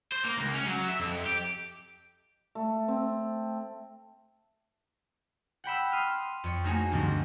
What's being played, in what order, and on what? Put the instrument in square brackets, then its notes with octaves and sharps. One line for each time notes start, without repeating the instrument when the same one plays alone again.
[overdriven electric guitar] C5
A#3
C#2
C#4
F#3
E5
F2
G4
[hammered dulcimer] A3
C4
[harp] F#5 G5 B5 E6
C6 D#6 F6
F2 C#5
A3 A#3 D#4 F#4 G#4 G#5
D2 G2 B2 F3 G3 C4